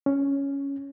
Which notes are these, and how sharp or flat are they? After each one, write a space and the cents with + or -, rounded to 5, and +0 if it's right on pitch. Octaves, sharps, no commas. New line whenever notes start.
C#4 +5